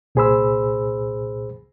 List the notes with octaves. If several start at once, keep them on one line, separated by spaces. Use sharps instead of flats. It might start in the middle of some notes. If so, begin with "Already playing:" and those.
C2 A#2 G#4 C5 B5 E6